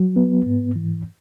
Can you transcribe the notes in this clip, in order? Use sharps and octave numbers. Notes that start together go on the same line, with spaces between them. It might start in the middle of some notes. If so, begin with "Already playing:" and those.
Already playing: F#3
B3
G#2
E3